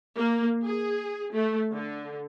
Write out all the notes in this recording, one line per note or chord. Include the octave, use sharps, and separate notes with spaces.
A#3
G#4
A3
D3